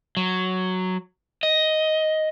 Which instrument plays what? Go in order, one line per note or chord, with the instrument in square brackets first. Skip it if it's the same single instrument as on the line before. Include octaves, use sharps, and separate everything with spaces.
[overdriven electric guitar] F#3
D#5